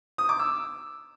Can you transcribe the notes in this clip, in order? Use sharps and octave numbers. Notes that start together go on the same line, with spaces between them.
D#6
D6
E6